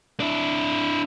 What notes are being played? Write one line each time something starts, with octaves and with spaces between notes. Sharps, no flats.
D4 E4